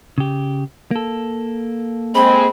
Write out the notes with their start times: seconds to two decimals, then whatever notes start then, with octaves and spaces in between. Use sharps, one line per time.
0.18 C#3 G4
0.91 A#3 A4
2.15 G#3 C4 B5